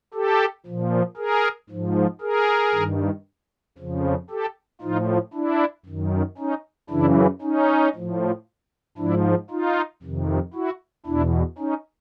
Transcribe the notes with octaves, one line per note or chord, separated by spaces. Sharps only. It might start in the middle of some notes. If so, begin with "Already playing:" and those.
G4 A4
A#2 F3
G#4 A#4
G#2 F3
G#4 A#4
G2 D#3
F2 C#3 F3
G4 A4
A2 F3 D#4 F4
D4 E4
F#2 D#3
C#4 D#4
F#2 C#3 E3 D4 E4
C#4 D#4
A2 F3
G#2 F3 D4 E4
D#4 F4
F2 C3 D#3
E4 F#4
E2 B2 D4 E4
C#4 D#4